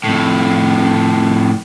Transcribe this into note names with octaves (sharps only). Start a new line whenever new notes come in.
F2 A2